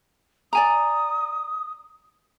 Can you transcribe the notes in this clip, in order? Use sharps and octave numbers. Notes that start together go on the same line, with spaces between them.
D5 G#5 A#5 D#6